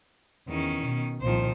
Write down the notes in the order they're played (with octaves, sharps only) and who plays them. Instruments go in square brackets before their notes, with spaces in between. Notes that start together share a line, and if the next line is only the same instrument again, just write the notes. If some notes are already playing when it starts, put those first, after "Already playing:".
[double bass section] E2 [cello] D#3 C#4
[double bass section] B2
[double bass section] C2 A#2 F3 [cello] D#3 C5